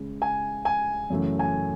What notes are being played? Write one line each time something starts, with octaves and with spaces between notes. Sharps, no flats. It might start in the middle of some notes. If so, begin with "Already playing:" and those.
Already playing: C#3 G#3
G#5
G#5
F#2 C#3 E3 A3
G#5